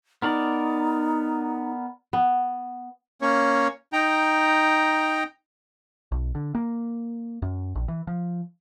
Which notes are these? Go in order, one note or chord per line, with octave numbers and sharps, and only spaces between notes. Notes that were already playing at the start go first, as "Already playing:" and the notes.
B3 D#4 A#4 D5
B3
A#3 C#4 C#5
D#4 G5 A#5
B1
D3
A#3
F#2
A#1
E3
F3